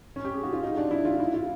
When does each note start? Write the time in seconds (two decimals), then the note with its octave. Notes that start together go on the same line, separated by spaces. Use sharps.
0.16 C#4
0.25 G4
0.34 G#4
0.43 F#4
0.53 F4
0.63 D#4
0.77 D4
0.91 E4
1.05 F4
1.20 E4
1.34 F4